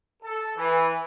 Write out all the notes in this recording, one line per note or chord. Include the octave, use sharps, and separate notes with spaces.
A4
E3